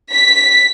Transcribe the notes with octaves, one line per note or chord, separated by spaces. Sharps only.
B6